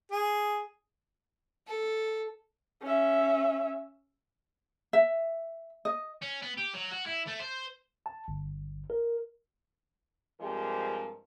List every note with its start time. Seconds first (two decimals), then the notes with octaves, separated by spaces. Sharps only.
0.12 G#4
1.67 A4
2.82 C#4 E5
4.93 E5
5.85 D#5
6.22 C#4
6.42 B3
6.57 G4
6.74 F#3
6.91 F#4
7.07 E4
7.28 A3
7.40 C5
8.06 A5
8.28 G1
8.90 A#4
10.41 G2 F3 G#3 C4 G4 A#4